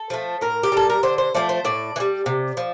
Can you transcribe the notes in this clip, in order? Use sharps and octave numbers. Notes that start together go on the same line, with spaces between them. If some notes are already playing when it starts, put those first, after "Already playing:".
Already playing: A4
F3 A3
A2 A#4
G4
G3 A4
A#4
D3 C5
C5
F3 A3 D5
C5
A2 D5
E3
G3
C3
F3